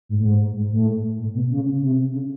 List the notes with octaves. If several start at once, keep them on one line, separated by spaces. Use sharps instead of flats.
G#2
A2
G#2
G#2
A2
A2
B2
C#3
C3
C#3